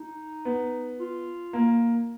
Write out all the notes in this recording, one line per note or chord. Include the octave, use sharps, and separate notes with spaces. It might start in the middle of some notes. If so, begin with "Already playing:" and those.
Already playing: D#4
B3
F4
A#3